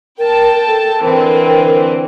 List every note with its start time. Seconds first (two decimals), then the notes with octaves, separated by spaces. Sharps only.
0.19 A#4 G5 A5
0.67 A4
1.02 D3 E3 C4 A#4